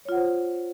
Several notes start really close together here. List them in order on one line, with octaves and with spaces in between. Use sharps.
C#5 F4 F#5 C5